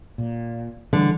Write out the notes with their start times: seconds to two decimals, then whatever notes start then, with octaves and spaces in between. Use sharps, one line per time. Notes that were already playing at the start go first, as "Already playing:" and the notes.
0.18 A#2
0.93 D3 E3 G3 G#3